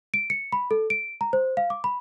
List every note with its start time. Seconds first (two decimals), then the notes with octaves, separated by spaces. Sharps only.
0.14 D7
0.30 C#7
0.52 B5
0.71 A4
0.90 D7
1.21 A#5
1.33 C5
1.57 F5
1.70 D6
1.84 B5